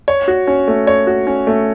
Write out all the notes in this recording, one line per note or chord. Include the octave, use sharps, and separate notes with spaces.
C#5
F#4
C#4
A3
C#5
F#4
C#4
A3